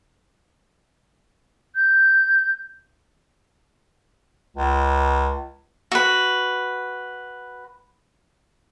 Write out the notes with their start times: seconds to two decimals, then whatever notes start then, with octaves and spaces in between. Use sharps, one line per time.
1.75 G6
4.57 C#2
5.92 F#4 B4